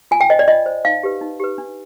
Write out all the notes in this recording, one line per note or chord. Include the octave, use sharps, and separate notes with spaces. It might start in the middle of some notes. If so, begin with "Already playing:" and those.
F4 G#5
G5
C5 D#5
D5
F4 D#5
C5
D#4 F5
G4 B4
D#4
G4 B4
D4